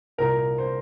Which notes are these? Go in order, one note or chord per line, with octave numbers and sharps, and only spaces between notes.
C2 A#2 A#4
C5